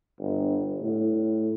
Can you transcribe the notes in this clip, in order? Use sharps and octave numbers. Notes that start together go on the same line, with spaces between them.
G1
A2